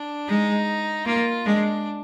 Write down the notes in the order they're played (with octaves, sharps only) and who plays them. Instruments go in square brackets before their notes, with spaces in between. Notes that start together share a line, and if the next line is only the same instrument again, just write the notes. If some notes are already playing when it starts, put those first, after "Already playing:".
Already playing: [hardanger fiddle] D4
[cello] G#3 [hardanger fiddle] D#4
[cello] A#3 [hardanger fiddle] F4
[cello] G#3 [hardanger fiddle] D4